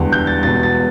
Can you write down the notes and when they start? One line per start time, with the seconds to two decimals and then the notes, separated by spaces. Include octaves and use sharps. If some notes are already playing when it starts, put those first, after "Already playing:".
Already playing: E1 E2 D3 G3
0.12 G6
0.27 A6
0.43 E1 E2 B2 A6
0.63 A6